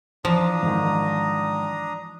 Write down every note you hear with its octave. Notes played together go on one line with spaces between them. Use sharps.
E3 F3 D4 A#5 D#6
G#2 D#3